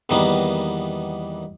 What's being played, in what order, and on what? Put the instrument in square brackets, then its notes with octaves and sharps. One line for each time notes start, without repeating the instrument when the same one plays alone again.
[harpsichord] E2 D#3 G3 A#3 B3